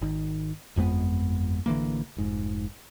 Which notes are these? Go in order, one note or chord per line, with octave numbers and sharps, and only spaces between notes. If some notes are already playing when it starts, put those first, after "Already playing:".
G#1 D#3
G1 F2 G#3 B3
A1 D3 E3 A#3
F1 G#2